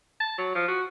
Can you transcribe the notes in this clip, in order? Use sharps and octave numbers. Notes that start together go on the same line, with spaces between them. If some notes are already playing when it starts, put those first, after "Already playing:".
A5
F#3
F3
F#4